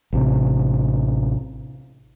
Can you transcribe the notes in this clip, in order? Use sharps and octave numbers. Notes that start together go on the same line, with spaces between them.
A1 C3